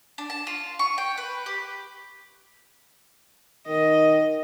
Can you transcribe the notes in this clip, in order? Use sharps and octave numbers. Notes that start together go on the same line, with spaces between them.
D4
A5
F4
C#6
G5
B4
G4
D#3 D#5